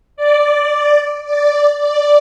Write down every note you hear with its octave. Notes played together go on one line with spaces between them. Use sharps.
D5
D5
D5